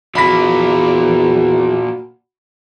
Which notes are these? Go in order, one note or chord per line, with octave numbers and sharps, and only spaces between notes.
E2 A#2 A#3 D4 F#4 B5 B6